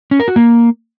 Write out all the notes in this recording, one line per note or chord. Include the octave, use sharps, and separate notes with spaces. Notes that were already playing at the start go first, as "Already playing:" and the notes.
C#4
A#4
F#4
A#3